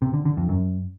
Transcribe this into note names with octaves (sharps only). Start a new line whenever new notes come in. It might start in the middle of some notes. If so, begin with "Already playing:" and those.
C3
D3
D3
F2
F#2